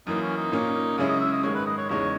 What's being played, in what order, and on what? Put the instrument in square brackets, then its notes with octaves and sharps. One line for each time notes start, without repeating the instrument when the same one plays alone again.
[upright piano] F#2 E3 A#3 [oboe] D#4
[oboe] C#4
D#4
[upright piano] A#2 A#3 C#4
[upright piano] F#2 C#3 G#3 C#4 E4 [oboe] G#4
[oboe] D#5
E5
D#5
[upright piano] G#2 D#3 G#3 [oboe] C#5
[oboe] B4
D#5
C#5
[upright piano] E2 C#3 G#3 D#4 [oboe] C#5